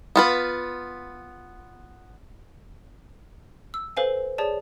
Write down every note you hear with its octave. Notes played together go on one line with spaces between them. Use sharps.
B3 F4 B4
E6
A4 B4 C5 F5 G#5
G#4 C#5 D5 A5